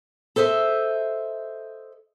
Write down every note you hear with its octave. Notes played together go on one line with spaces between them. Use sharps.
A4 C5 D#5 E5